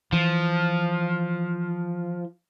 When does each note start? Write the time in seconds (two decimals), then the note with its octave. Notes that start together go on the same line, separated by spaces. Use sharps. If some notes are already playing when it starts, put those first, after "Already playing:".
0.12 E3 F3